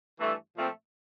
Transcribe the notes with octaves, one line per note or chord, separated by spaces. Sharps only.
G2 E3 A3
A#2 F3 A3 C4